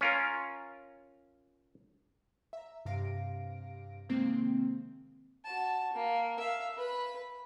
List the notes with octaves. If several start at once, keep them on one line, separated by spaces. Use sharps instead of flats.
C#4 F4 A#4
E5 A#5
G2 C3 G4 F5 A#6 D7
C3 D#3 G#3 A#3 C4
F#4 A5
A#3
E5 F5
B4 B5